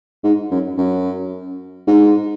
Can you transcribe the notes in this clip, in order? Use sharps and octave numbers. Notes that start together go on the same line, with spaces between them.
G#2
F#2
F#2
G#2